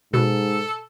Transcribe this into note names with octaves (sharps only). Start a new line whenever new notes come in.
G#2 B2 A4